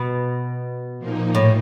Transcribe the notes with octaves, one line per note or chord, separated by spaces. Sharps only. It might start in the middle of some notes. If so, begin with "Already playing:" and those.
Already playing: B2
A#2 F3 A#3 D#4
A2